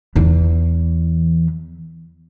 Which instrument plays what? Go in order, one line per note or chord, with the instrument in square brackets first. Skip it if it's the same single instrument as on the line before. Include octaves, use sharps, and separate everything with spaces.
[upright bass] E2 E3